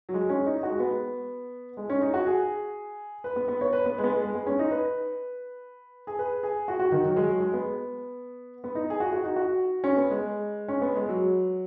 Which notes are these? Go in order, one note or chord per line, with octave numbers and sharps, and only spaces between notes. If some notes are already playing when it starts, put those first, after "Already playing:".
F#3
G#3
C#4
D#4
D#4
F#4
G#3
B3
G#3
C#4
D#4
F#4
G#4
B4
B3
B3
C#5
B4
B3
G#3
B3
G#3
G#3
B3
C#4
D#4
B4
G#4
B4
G#4
F#4
F#4
D#3
F#3
G#3
F#3
G#3
B3
B3
D#4
G#4
F#4
F#4
D#4
F#4
C#4
B3
G#3
C#4
B3
G#3
F#3